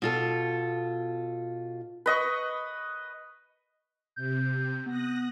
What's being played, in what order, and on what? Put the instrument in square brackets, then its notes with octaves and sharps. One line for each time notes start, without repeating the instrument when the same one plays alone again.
[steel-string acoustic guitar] B2 F4 A4
[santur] B4 D#5 C#6
[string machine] C3 [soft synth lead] G6
[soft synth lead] B3 [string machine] D#6 F#6 A#6